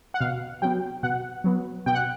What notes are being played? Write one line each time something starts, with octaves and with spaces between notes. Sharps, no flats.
F#5
B2 F5
F#3 B3 G5
B2 F#5
F#3 B3
B2 G5
F#5